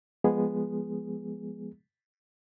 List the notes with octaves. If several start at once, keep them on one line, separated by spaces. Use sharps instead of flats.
F3 G#3 B3 G#4